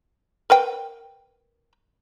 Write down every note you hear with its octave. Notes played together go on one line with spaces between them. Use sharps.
A#4 B4 G5